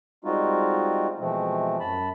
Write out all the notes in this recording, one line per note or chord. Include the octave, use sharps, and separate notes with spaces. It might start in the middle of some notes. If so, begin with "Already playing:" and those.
G3 G#3 C4 D#4 F4 F#4
B2 E3 F3 G#3 A3 C4
F#2 A5 B5